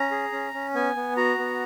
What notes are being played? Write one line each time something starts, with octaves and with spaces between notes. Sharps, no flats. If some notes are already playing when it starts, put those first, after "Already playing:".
Already playing: C#4 A#5
G#4
C#4
C#4
B3 G#5
B3
F#4 A#5
B3